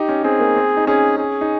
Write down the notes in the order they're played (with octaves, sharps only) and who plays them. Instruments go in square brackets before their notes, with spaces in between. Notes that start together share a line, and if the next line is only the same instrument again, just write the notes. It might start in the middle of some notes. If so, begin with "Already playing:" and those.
Already playing: [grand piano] D#4 [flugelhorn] G4
[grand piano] C#4
[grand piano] C4 [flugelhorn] G#4
[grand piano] A#3
C4
D#4
[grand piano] C#4 [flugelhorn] G#4
[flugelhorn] G#4
[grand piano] D#4